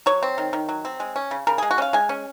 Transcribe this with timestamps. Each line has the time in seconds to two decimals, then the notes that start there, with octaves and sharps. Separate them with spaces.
0.06 F#3 C#5
0.23 C4
0.38 D#3
0.53 D#3
0.69 F#3
0.85 C4
1.00 G#3
1.16 C#4
1.31 C#3
1.47 C#3 A#4
1.58 G#3 G#4
1.71 F#4
1.78 C#4 F5
1.93 G#3 G#5
2.09 C#4